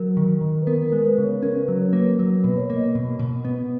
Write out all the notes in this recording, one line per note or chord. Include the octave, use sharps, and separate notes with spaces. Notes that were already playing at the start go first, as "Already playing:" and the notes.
Already playing: F#3 A#4
D#3
D#3
B4
B3 A#4
A#4
G#3
A#4
B4
C#3
C#5
C#4 A#4
B4
F#3
C#5
A#3
B4
F#3 A#4
B2 B4
C#5
A#3
D#5
B2
B2
B3